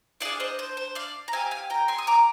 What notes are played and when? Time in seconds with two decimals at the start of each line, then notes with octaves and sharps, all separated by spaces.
0.20 D4 F4 G#4 D5 F5
0.40 C5 D#5
0.59 C5
0.77 C5
0.95 D5 F5
1.28 A#5
1.33 C4 G4 F5 G#5
1.51 F5 G#5
1.70 G5 A#5
1.88 G#5 C6
1.98 D#6
2.07 A#5 D6